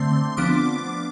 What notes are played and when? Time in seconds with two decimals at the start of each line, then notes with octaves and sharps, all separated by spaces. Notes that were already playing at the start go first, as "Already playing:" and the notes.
Already playing: D3 A3 C4 C6
0.37 F3 B3 D4 D6